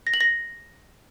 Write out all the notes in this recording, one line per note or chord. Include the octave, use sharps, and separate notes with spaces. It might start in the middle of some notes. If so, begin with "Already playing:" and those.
A#6
F#7
A#6